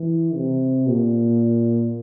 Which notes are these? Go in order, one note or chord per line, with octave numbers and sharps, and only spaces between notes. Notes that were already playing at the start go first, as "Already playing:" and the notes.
Already playing: E3
C3
A#2